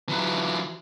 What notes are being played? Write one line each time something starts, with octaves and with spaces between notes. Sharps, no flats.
E3 F#3